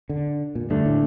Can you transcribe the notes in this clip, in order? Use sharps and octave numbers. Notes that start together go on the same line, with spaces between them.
D3
A#2
G2 D3 A3 D4
A2